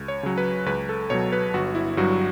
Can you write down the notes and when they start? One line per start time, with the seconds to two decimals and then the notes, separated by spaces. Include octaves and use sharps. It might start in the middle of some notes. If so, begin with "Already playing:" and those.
Already playing: C#2
0.08 C#5
0.23 C#3 F#3
0.38 B4
0.66 C#2 B4
0.89 A4
1.10 B2 F#3 C#5
1.32 B4
1.54 G1 F#4
1.75 E4
1.97 G2 F#3 F#4